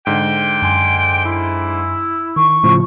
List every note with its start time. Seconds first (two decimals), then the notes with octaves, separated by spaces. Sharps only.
0.07 G#2 D3 G5
0.62 F#2 G#5 C6
1.25 E4
2.36 D#3 C#6
2.64 A2 C#3 F3